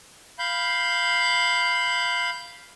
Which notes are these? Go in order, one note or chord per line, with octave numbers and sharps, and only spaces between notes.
F5 B5 G6